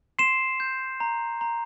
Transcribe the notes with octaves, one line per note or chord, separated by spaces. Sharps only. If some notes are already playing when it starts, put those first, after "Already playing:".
C6 C7 E7
G6
A#5
A#5